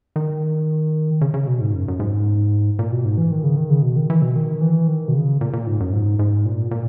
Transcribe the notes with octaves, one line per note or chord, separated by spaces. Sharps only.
D#3
C#3
C#3
B2
G#2
F#2
F#2
G#2
A#2
B2
G#2
E3
D#3
C#3
D#3
C#3
B2
D#3
E3
B2
D#3
E3
D#3
B2
C#3
A#2
A#2
G#2
F#2
G#2
G#2
A#2
A#2